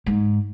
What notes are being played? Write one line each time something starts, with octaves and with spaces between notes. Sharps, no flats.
G#2